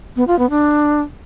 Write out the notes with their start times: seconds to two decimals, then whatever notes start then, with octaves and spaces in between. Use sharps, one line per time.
0.16 B3
0.27 F4
0.39 B3
0.50 D4